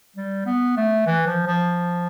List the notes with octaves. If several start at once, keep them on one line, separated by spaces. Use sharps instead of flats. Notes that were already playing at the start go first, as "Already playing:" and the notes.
G3
B3
A3
E3
F3
F3